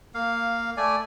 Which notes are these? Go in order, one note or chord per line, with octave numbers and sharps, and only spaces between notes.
A#3 F5
A3 D5 G#5